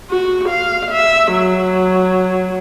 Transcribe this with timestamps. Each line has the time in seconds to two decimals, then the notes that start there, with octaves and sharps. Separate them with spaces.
0.10 F#4
0.49 F5
0.91 E5
1.32 F#3